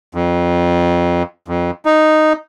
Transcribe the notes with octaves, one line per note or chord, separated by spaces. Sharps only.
F2
F2
D#4